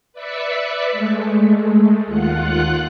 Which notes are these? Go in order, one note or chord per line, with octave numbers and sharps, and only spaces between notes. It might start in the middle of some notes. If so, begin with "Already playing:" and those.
B4 D5 E5 B6 C#7
G#3 A3
D#2 F4 F#5 F#6